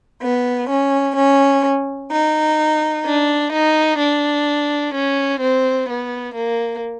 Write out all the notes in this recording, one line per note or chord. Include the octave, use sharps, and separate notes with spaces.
B3
C#4
C#4
D#4
D4
D#4
D4
C#4
C4
B3
A#3